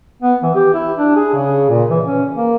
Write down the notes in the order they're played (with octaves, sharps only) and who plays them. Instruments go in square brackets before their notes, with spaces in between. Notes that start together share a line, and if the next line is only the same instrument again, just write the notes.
[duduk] B3
E3
G4
E4
D4
G#4
C#3
A#2
E3
C#4
A#3